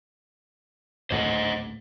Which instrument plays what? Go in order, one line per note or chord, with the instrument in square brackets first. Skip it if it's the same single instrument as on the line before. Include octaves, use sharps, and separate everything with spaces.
[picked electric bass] G#1 D2 A2 [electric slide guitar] C5 D#5 F#5